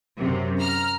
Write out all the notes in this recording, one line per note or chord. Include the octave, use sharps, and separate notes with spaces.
F#2 C3
A#5 F6